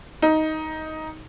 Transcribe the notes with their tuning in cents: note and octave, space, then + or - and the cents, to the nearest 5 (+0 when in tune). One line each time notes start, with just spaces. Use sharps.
D#4 +10